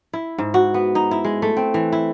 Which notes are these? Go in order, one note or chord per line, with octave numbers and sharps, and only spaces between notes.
E4
G#2
F#4
B3
D#4
E4
G#3
A3
C4
E3
E4